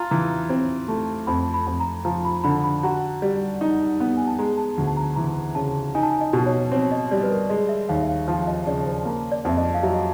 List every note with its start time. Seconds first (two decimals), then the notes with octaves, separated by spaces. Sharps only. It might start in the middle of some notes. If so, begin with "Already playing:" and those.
Already playing: F4 A5 A#5
0.11 E3 A#5
0.31 A#5
0.49 C4
0.88 A3
1.27 F2 B5
1.54 B5
1.67 F2
1.80 A#5
2.05 F3 A#5
2.25 B5
2.44 D3 B5
2.64 B5
2.83 F#4 A#5
3.22 G3
3.61 D#4
4.00 B3
4.17 G#5
4.28 A5
4.39 G#3 A#5
4.58 A5
4.78 D2
4.87 A5
4.97 A#5
5.16 E3 A#5
5.55 C#3 A5
5.95 D#4 G#5
6.03 A5
6.11 G#5
6.21 D#5
6.33 B2
6.46 C#5
6.72 C4 C#5
6.91 D#5
7.11 G3 D5
7.23 B4
7.31 A#4
7.50 G#3 D#5
7.69 E5
7.89 D#2 F5
8.02 E5
8.08 F5
8.28 F3 E5
8.47 D#5
8.67 C#3 D5
8.86 C5
9.05 A#3
9.32 D5
9.45 F2 E5
9.57 D#5
9.74 F5
9.83 F#3 E5
9.94 D#5